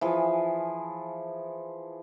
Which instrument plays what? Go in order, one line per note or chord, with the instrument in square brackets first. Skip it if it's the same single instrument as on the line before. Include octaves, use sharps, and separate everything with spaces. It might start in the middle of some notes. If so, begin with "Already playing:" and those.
[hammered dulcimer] E3 F3 G#4